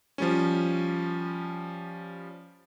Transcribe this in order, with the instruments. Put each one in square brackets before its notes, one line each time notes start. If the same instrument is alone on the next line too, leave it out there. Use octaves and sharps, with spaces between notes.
[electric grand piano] F3 G3 C#4